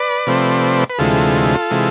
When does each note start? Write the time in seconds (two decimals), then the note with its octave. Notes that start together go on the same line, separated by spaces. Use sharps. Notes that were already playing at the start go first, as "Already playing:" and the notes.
Already playing: B4 D5
0.27 C3 F3 A3 C4
0.90 B4
0.99 D2 C3 E3 G#3 F4 A4
1.71 C3 E3 G#3